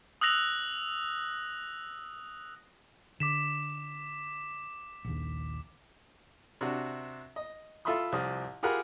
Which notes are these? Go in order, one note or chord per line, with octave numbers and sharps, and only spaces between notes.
D#6 E6 F#6 A#6 F7
D3 D6 B6 E7
A#1 D#2
C3 D4 F#4
D#5
F4 A4 E5 B5 C6 D#6
C2 F3 G4 D#6
F4 G4 G#4 A#4 F#5 B5